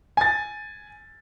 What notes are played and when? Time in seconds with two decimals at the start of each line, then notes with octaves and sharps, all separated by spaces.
0.17 G#5 A6